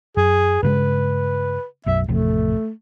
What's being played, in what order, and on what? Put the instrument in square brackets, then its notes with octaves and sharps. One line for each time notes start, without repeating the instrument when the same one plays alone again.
[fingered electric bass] F#2 [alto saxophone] G#4
[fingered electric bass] G2 C#3 G#3 [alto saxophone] B4
[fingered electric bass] B1 F#2 [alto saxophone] E5
[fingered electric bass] A1 F2 C3 [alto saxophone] A3